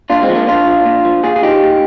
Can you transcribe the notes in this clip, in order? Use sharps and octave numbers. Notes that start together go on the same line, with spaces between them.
A#2 D4 F4
G#3 C4
F3
A#3 D4
A#2 D4 F4
F3
A#2
F3
A#2 F4 G#4
G#4
F3 D#4 G4
A#2